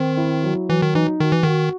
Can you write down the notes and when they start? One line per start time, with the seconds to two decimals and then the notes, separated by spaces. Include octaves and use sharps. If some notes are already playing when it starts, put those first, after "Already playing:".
Already playing: D#3 C4
0.17 E4
0.43 F#3
0.69 E3 F#3
0.82 D#3
0.95 E3 D#4
1.20 D#3 F#4
1.32 E3
1.43 D#3 F#4